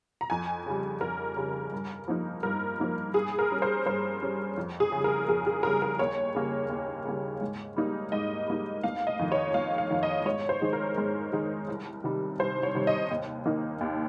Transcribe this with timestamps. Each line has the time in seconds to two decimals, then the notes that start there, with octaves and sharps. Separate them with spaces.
0.21 A#5
0.30 F2 G#5
0.66 C#3 G3
1.01 F2 A#4
1.37 C#3 G3
1.72 G2
2.08 F3 A#3 D#4
2.43 G2 A#4
2.80 F3 A#3 D#4
3.14 G2 G#4
3.39 A#4
3.51 G3 C#4
3.62 C5
3.86 G2 C5
4.22 G3 C#4
4.57 F2
4.80 G#4
4.92 C#3 G3
5.04 A#4
5.28 F2 G#4
5.47 G#4
5.63 C#3 G3 A#4
5.82 A#4
5.99 D#2 C#5
6.35 C#3 G3 A#3
6.70 D#2
7.05 C#3 G3 A#3
7.41 G#2
7.76 G3 A#3 D#4
8.12 G#2 D#5
8.48 G3 A#3 D#4
8.83 F1 F5
9.07 D#5
9.19 F2 D#3
9.32 C#5
9.54 F1 F5
9.78 F5
9.90 F2 D#3
10.03 D#5
10.25 G#2 C#5
10.49 C5
10.61 D#3 G#3 D#4
10.73 A#4
10.98 G#2
11.32 D#3 G#3 D#4
11.68 C2
12.04 C3 D#3 G3
12.39 C2 C5
12.63 C#5
12.75 C3 D#3 G3
12.87 D#5
13.11 D#2
13.46 D#3 A#3 D#4
13.81 D#2